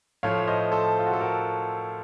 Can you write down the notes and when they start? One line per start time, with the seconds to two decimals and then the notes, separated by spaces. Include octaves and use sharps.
0.23 A2 F3 A3 C#5 F5
0.47 C5 D#5
0.71 A4 C5
0.99 F4
1.06 F#4
1.13 A4
1.21 F#4 A#4